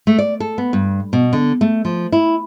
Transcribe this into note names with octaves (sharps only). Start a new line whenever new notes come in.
A3
D5
A4
B3
G2
B2
D3
A3
F3
E4